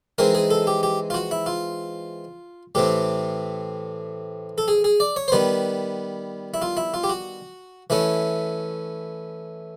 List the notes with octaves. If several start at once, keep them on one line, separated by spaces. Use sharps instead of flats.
E3 G#3 C4 D#4 A#4
G#4
A4
G4
G4
F4
F#4
E4
F4
A2 E3 A3 C4 G4
A4
G#4
G#4
D5
C#5
C5
D#3 G3 B3 B4
E4
F4
E4
F4
G4
F#4
E3 A3 C#4 E4